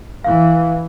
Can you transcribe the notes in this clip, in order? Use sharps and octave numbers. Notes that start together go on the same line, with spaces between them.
E3 F5